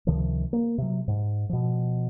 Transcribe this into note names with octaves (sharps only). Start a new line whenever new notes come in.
C#2 C3 D#3 F3
A#3
C3 F#3
G#2
B2 F3